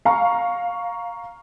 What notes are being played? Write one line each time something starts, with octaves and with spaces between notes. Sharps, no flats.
F5 A#5 C#6